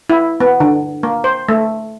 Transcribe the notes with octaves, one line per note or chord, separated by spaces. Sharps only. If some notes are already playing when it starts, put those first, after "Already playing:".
E4
B3
D3
A#3
C5
A3